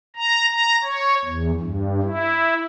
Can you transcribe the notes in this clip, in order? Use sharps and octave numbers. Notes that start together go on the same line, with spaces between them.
A#5
A#5
C#5
E2
G2
E4